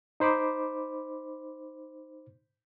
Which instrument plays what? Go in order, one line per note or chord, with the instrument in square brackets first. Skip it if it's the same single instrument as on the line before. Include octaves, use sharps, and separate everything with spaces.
[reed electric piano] D#4 C5 B5 D6